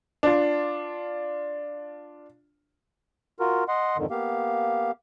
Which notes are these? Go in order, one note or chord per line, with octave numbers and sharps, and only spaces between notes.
D4 F4
F4 F#4 A#4
D#5 F#5 C6
F2 G#2 D3 D#3
A#3 B3 G4 F5